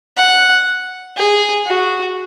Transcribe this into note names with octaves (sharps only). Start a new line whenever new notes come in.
F#5
G#4
F#4